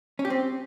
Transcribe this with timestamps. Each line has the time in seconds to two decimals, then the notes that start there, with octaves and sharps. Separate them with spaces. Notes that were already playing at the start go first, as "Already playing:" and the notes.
0.19 C#4
0.25 G4
0.30 C4